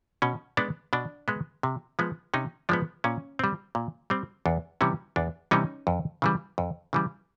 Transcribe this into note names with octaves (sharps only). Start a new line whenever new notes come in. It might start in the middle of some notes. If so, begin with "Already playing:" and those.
B2 C#4
G#3 B3 D4
B2 D4
G#3 B3
C3
F3 G#3 B3
C3 C#4 D#4
F3 G#3 B3 D4
A#2 C#4
G3 C4
A#2
G3 C4
E2 D4
C3 E3 G3 C#4
E2 D4
C3 E3 G3 C#4 D#4
F2
C#3 E3 G3
F2
C#3 E3 G3